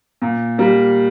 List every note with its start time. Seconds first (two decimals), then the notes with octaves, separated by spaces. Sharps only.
0.22 A#2
0.58 G3 A#3